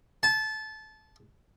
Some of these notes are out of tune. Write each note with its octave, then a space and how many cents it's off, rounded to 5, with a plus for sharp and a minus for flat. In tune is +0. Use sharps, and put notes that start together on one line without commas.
A5 -20